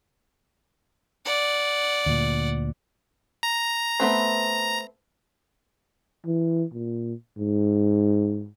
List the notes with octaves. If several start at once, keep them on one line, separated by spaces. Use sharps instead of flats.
D5 F#5
D2 A#2
A#5
A3 B3 C4
E3
A#2
G#2